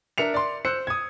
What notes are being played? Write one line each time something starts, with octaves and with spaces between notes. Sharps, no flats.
D4 A#4 E5 C#7 F7
D5 C6
C5 E6 F#6 C#7
D#6 G#6